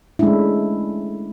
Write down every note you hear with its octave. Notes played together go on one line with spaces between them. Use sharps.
G#3 A3 C#4 D4 E4